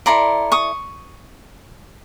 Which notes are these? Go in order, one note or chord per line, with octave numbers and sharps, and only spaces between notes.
E4 A4 D5 A#5 C6
C#6 D#6